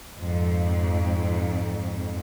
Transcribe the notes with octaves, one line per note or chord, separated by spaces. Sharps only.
F2 G#2